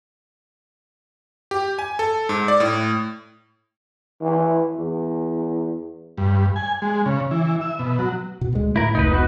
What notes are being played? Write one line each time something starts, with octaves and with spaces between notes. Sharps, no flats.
G4
G#5
A4
G#2
D5
A2
E3
E2
G2
G#5
G#3
C#3
E3
E5
B2
F#3
B2
D2 G#3
A2 E4 A#4
F1 C#2 D#4 B4
B3 D#4 F#4